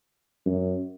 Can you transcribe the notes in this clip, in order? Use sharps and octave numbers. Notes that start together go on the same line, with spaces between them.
F#2